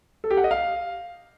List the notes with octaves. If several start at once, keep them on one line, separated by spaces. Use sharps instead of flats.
A4
G4
F#5
D#5
F5